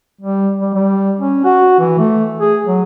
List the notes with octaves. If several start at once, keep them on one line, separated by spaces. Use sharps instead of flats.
G3
G3
G3
C#4
F#4
E3
A3
G#4
F#3